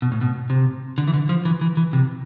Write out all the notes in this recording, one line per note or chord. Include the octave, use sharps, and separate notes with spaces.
B2
A2
B2
C3
D3
E3
D3
F3
E3
E3
E3
C3